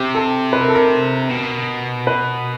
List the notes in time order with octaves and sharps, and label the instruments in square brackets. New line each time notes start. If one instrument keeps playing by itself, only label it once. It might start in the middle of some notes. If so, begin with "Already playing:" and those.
Already playing: [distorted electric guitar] C3 [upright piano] G4
[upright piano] A4
B4
A#4
A4
A#4
[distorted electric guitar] B2
[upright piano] B4